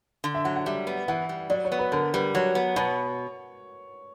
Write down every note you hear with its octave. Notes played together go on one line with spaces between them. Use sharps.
D3
E5
F#3 F#5
F#5
G3 E5
B3
E3 F#5
G3
F#3 D5
C#5
B3
B4
D3 A#4
G3 B4
F#3 C#5
B3
B2 C#5